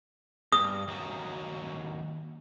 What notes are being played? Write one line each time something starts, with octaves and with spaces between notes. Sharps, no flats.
G2 D#6
D#2 F#3